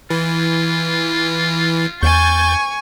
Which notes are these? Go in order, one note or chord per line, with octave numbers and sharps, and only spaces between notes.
E3 F4
E2 G#5 C#6 G6 A6